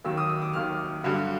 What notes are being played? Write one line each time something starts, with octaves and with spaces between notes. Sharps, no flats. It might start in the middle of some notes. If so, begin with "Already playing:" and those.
D#2 D#3 F#3 E6
D#6
E6
D6
D#2 D#3 F#3 F6
G2 D3 F#3